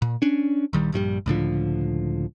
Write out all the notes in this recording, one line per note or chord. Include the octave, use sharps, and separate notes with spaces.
A#2
C#4 D4
A#1 D#3 G3
A#1 G2 F3 G3
C#2 A2 D3 F3